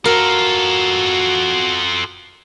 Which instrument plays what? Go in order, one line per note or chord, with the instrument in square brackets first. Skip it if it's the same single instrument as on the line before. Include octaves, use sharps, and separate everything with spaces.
[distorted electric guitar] F4 A4 [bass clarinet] F#4 [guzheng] A#4